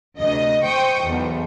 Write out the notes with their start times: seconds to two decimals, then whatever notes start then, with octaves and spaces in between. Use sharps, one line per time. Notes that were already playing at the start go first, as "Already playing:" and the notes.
0.19 D2 C3 D#5
0.64 C5 G5 C#6 D#6
1.06 B1 E2